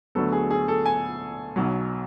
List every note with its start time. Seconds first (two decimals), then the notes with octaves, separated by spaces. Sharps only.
0.15 D2 D3 F#3 B3 A4
0.32 G#4
0.51 G#4
0.68 A4
0.86 G#5
1.56 B1 B2 F#3